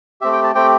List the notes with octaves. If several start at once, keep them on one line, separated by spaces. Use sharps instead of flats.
A3 C4 G4 E5
G5
A5
A3 C4 G4 G5